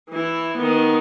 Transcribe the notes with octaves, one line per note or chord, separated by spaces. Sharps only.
E3 E4
D#3 B3